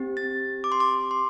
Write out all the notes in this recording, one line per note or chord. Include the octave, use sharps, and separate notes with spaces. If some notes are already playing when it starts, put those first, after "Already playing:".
Already playing: C4 G4
A6
D6
C6
D6
C6